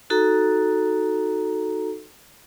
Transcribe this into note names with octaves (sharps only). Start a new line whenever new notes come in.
D#4 F#4 A4 A#5